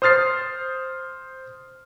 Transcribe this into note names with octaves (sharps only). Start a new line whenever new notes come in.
C5 D#6 F6 A6 C7